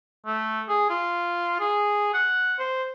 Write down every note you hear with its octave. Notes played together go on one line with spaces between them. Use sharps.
A3
G#4
F4
G#4
F#5
C5